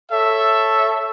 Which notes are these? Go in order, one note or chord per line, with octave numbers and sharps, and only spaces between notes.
A4 C#5 E5